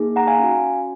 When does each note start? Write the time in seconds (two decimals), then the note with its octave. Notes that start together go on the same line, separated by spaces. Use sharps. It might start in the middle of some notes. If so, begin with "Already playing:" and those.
Already playing: A#3 D#4 G#4
0.16 F#5 A#5
0.27 F5 G#5
0.39 C#4 F#4